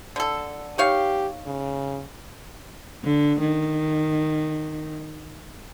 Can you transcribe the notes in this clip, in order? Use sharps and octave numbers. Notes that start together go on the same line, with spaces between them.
D3 A4
D#4 G4 C#5 F5
C#3
D3
D#3